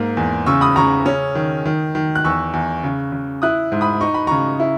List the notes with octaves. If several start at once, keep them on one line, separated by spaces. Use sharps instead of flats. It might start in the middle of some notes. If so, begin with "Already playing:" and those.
Already playing: G#2 A#3
E2
C#3 C#6 E6
B5 D#6
C#3 A#5 C#6
C#4
D#3
D#3
D#3
F#6
E2 C#6 E6
E2
C#3
C#3
E4 D#6 F#6
G#2
B5 D#6
D#4 C#6
B5
C#3 A#5 C#6
E4